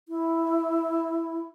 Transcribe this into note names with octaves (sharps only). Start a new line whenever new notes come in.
E4